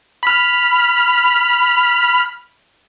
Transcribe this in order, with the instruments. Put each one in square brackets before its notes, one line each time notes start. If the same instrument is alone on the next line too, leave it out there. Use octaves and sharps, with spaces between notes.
[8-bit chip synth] B5 F6